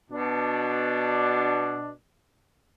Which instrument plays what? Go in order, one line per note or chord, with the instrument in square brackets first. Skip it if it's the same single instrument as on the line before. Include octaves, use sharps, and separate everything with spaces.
[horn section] B2 D4